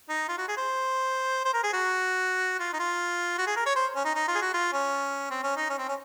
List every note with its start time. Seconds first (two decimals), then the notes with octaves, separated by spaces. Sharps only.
0.09 D#4
0.28 F4
0.38 F#4
0.48 G#4
0.57 C5
1.45 C5
1.53 A#4
1.63 G#4
1.73 F#4
2.60 F4
2.73 D#4
2.79 F4
3.38 F#4
3.47 G#4
3.56 A#4
3.66 C#5
3.76 C5
3.96 C#4
4.05 D#4
4.15 D#4
4.28 F4
4.35 G#4
4.41 F#4
4.54 F4
4.73 C#4
5.31 C4
5.44 C#4
5.57 D#4
5.70 C#4
5.78 C4
5.89 C#4